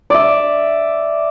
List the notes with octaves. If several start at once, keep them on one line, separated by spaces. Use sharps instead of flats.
D5 E5